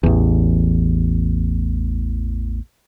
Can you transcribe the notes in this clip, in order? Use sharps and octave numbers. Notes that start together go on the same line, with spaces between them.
A1 E2